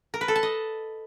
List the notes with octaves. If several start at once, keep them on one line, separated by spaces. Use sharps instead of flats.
A#4
B4
A4
A5
D#5